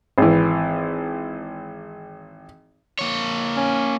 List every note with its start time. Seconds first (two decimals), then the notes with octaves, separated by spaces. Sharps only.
0.18 G#1 E3
2.99 A#3 C#5
3.57 C#4